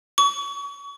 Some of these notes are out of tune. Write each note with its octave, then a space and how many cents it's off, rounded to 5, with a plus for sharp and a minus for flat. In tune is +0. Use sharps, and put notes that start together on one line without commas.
C#6 +35